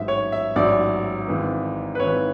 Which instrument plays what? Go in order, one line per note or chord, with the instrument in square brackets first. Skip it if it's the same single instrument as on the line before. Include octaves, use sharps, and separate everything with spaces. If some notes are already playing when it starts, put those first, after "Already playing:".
Already playing: [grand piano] A1 G#2 F#3 E5
C#5
E5
A1 G#2 F#3 D5
G#1 G#2 E3
B4
G#1 G#2 E3 C#5